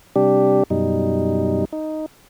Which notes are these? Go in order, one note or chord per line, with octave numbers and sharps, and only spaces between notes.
C3 G3 D4 G4
F#2 B2 G3 D#4
D#4